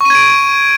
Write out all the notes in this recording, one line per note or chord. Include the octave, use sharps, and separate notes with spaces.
C#6 G#6 D7 D#7